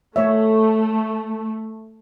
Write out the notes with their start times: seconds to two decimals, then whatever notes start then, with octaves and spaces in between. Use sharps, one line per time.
0.16 A3 A#3 C#5 E5